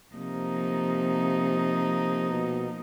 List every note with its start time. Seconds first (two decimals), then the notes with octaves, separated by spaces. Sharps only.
0.13 C3 F3 A#3 D#4
2.30 B2